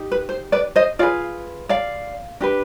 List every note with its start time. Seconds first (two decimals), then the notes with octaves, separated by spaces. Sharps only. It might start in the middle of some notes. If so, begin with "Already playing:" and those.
Already playing: D#4 G4
0.12 B4
0.29 C5
0.52 B4 D5
0.76 C5 D#5
0.99 F4 G#4 B4 D5 F5
1.69 D5 F5
2.41 D4 G4 B4